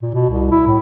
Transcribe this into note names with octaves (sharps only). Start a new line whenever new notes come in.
A#2
B2
C2
E4
A2